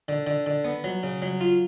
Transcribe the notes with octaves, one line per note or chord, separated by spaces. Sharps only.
D3
D3
D3
B3
F#3
C#3
F#3
F4